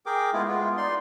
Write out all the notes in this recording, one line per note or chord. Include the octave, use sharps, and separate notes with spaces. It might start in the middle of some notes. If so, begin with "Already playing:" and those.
G#4 A#4 G5 D6
G#3 A3 B3 E4 F4
G#3 B3 F4
D#4 D5 C6